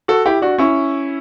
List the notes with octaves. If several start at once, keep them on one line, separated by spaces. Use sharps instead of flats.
F#4 A4
E4 G4
D4 F#4
C#4 E4